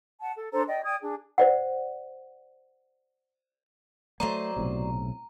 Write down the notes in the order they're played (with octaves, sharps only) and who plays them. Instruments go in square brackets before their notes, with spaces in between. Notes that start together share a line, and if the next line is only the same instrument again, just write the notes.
[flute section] F#5 A5
A4
D4 A4 C5 A#5
D5 D#5 G5
D5 G5 D#6 G#6
D4 G#4
[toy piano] C5 D5 F#5
[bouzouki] F#3 C5 D5 [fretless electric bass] A3 A#3 [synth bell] A#5
[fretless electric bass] B1 A2 C3